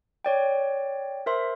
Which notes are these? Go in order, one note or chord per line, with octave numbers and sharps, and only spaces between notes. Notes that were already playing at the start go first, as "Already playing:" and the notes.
C#5 D5 G5
A#4 C5 E5 C6